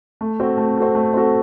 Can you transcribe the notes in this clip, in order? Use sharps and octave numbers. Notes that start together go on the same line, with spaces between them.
A3
C4 F#4 A4
A3
C4 F#4 A4
A3
C4 F#4 A4